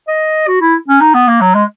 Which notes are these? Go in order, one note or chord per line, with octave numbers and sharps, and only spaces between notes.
D#5
F#4
E4
C#4
D#4
B3
A#3
F#3
G#3